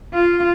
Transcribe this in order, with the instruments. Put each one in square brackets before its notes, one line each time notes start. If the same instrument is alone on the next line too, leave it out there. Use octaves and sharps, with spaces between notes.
[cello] F4